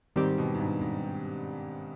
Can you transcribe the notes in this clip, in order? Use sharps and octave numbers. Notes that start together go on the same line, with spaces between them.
G#2 D#3 G3 C4 G4
B2
G#2
G2
G#2